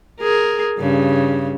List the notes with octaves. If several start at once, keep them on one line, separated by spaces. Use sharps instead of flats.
G#4 A#4
G2 C#3